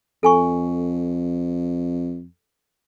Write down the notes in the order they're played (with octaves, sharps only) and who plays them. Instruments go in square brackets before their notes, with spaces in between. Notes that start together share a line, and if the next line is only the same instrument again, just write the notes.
[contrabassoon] F2 [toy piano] A4 G#5 C#6